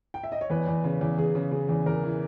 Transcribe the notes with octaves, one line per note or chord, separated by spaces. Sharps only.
G5
E5
D#5
C#5
E2 B4
E2
C#3
E2
E2 G#4
C#3
C#3
E2
E2 A#4
E3